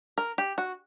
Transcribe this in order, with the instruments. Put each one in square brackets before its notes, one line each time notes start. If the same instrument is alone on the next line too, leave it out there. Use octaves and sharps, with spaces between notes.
[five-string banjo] A#4
G4
F#4